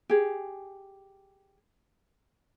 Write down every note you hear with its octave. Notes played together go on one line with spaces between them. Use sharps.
G4 G#4